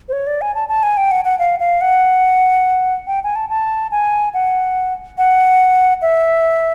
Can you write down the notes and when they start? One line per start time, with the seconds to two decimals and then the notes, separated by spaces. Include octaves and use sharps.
0.09 C5
0.13 C#5
0.27 D5
0.41 G#5
0.55 A5
0.69 A5
0.83 G#5
0.97 G5
1.11 F#5
1.25 F#5
1.39 F5
1.60 F5
1.81 F#5
3.07 G5
3.24 G#5
3.36 A5
3.49 A5
3.91 G#5
4.34 F#5
5.18 F#5
6.02 E5